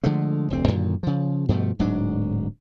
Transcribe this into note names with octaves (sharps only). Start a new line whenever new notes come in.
D3 F3 G#3 A3
F1 D2 C4
F#2 A#2 D3 D#3
C#3 F3
G2 B2 F3 A3
D1 G#2 F#3 D4